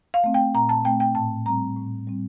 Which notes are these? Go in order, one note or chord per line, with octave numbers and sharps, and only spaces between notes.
F5
A3 C4
G5
A#2 A#5
A5
A3 C4 G5
G5
A2 A5
G3 C4 A#5
A2
G3 C4